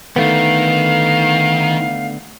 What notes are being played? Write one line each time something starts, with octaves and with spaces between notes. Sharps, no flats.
D3 D#3 A3 B3 F5